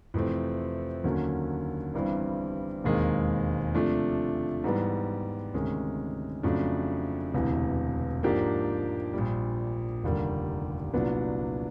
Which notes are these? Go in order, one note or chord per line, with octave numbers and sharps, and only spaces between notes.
F2 C3 E3 A3 C4
D#2 D3 F#3 A#3 C#4
G1 G2 E3 G3 C4
E1 D#2 D#3 G#3 C4
C3 F3 A3 D4
G#2 E3 G3 B3
D2 C3 D#3 G#3 C#4
F2 C#3 F#3 A3 D4
E1 D2 C3 E3
G#2 F3 A#3 D4 G4
A#1 A#2 G3
F1 D#2 D3 G3 A#3
C2 A#2 F#3 B3 D4